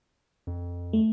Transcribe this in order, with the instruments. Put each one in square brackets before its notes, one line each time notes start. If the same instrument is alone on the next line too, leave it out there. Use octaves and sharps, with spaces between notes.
[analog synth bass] F2
[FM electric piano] A3